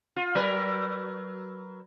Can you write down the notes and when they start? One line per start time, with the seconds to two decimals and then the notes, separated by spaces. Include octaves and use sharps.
0.16 F4
0.35 F#3 A#4 B4